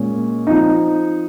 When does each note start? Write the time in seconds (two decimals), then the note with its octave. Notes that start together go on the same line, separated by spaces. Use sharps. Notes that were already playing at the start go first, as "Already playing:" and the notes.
Already playing: A#2 G#3 C#4
0.47 F3 C4 D#4